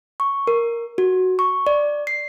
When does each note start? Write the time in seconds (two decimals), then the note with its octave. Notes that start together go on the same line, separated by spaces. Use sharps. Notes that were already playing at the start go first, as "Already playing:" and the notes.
0.20 C#6
0.47 A#4
0.98 F#4
1.39 C#6
1.67 D5
2.07 C7